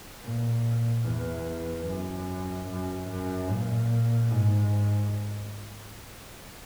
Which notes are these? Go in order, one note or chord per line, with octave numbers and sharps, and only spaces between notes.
A#2
E2
F#2
F#2
F#2
A#2
G#2